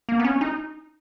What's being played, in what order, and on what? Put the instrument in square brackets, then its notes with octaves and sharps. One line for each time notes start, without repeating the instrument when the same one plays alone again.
[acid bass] A#3
B3
C#4
D#4